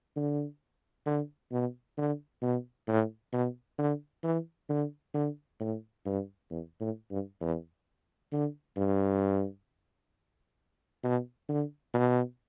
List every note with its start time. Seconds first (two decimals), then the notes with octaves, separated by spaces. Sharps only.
0.16 D3
1.06 D3
1.51 B2
1.98 D3
2.42 B2
2.88 A2
3.33 B2
3.78 D3
4.23 E3
4.70 D3
5.14 D3
5.60 A2
6.05 G2
6.50 E2
6.81 A2
7.11 G2
7.41 E2
8.32 D3
8.76 G2
11.04 B2
11.49 D3
11.94 B2